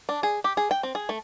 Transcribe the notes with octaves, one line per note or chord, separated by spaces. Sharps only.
D4
G#4
G4
G#4
G5
C4
G#4
A3